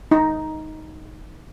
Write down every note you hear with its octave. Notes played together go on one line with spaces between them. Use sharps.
D#4